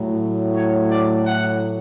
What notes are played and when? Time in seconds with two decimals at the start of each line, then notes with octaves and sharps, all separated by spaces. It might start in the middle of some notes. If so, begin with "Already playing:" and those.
Already playing: A2 F#3
0.55 C#5
0.90 D5
1.24 F#5